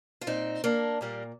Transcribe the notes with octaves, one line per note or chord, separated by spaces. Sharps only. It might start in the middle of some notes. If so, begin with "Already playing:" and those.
F4
A#2 C4 D#4
A#3 D4
A#2 G3 A#3